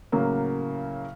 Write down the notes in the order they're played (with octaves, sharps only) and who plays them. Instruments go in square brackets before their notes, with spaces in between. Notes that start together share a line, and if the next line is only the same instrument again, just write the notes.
[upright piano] A2 C#3 F#3 A#3